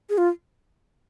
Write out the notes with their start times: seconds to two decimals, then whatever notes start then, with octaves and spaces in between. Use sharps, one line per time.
0.10 G#4
0.18 F4